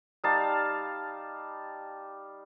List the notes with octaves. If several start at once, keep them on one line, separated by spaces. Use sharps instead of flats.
G3 D#4 F5 A5